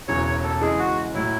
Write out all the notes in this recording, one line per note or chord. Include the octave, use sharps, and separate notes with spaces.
E1 E2 C#3 F#3 C#5
C#5
A4
C#3 E3 G#3 G#4
F#4
A2 F#3 E4